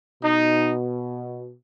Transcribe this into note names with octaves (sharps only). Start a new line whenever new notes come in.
B2 D#4